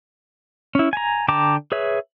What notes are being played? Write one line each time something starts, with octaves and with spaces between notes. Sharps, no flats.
C#4 E4
G#5 A#5
D3 G5 A5 A#5 D6
G#4 B4 C#5 E5